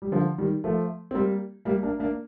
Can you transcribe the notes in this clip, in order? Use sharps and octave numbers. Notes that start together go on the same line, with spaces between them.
G3
D3 F3
D#3 G3
F3 A3
C4
G3 A#3
G3 A#3
A#3 D4
A#3 D4